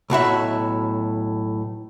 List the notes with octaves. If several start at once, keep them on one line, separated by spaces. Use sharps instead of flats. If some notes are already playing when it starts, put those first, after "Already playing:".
B1 A2 F#4 E5